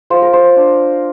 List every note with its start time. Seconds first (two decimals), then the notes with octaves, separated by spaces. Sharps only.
0.10 F4 C5
0.22 A#4
0.33 C5
0.56 D4